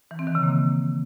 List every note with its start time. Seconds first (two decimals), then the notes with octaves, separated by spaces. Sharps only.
0.11 E3
0.19 C4
0.27 D#3
0.35 C#3
0.43 A#3